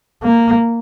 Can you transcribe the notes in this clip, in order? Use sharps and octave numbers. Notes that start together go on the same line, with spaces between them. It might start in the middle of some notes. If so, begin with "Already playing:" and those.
A#3